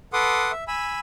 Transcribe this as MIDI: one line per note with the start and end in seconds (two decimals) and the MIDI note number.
0.13 0.51 69
0.13 0.51 71
0.13 0.51 78
0.13 0.51 84
0.13 0.51 86
0.13 0.51 87
0.52 0.64 76
0.68 1.00 80
0.68 1.00 83
0.68 1.00 88